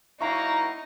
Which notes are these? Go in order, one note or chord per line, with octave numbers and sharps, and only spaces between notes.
F#3 A#3 D#4 E4 A#5 C#6